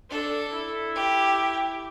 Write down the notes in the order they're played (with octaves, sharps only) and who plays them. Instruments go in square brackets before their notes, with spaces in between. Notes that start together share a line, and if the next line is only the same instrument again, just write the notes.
[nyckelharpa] D4 [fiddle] A4
[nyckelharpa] E4
[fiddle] G4